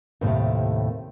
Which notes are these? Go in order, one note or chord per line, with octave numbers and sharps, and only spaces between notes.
D#2 A2 C3 A3